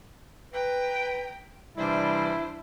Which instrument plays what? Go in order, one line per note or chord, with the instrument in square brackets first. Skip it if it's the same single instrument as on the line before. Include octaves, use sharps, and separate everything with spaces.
[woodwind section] B4 [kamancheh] G5 A#5
[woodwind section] C3 E3 G3 [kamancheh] D4 C5 [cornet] E4